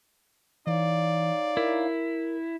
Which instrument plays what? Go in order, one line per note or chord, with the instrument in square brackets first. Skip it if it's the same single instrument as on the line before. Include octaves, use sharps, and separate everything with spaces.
[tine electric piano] E3 [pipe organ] D#4 C#5 F5 [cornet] D5
[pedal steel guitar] E4 [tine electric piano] A#4